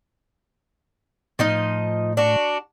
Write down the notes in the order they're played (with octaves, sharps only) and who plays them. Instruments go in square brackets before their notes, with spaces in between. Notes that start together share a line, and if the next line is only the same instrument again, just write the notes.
[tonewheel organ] A2 [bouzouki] F3 D#4 D#5
[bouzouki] D4 F#4